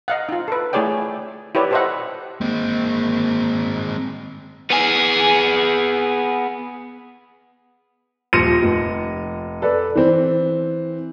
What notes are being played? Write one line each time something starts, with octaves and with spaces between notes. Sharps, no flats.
D#5 F5 F#5
D#4 F4
A4 B4
A3 E4 G#4 C#5 D5 G5
E4 G4 B4 C#5 D5
G4 A4 C5 D#5 E5 F#5
G#3 A#3 C4
B3 G#4
D#1 F3 C6 A#6 C#7 D#7
F1
A4 B4 D5
E3 C4